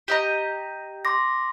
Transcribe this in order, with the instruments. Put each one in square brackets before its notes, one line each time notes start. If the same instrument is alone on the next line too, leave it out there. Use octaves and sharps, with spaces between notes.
[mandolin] G4 D#5 A#5
[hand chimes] C6 D6 A#6